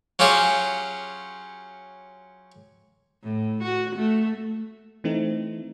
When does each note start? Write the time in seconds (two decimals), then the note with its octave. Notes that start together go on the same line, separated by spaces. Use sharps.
0.19 F#3 C#4 F4 G4 G#4
3.23 A2
3.63 F#4
3.96 A3
5.04 E3 A3 C4 D#4